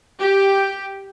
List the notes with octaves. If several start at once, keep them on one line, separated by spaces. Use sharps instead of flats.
G4